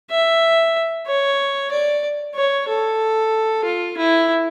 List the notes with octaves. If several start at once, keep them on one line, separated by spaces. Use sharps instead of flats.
E5
C#5
D5
C#5
A4
F4
E4